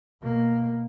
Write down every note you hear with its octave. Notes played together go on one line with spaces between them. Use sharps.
B2 A#3